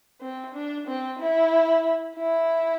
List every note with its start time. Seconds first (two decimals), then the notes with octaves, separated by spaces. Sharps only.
0.21 C4
0.55 D4
0.87 C4
1.19 E4
2.16 E4